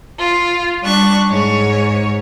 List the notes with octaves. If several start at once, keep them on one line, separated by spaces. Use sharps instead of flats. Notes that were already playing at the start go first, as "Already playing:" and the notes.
F4
G3 D4 C#6 F#6
G#2 C#5